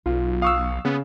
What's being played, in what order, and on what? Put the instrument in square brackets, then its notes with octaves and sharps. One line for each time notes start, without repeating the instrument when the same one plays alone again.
[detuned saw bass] B1 [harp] F4
[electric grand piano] F5 C#6 E6 [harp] D#6 F#6 C7
[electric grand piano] C#3 [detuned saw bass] B3